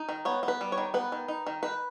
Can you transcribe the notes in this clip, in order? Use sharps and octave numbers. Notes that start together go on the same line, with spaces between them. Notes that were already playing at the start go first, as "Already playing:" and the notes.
Already playing: D#4
D#3
B3 C#5
B3
B4
G3
C#5
D#3
B3 B4
D#3
D#4
D#3
D#3 B4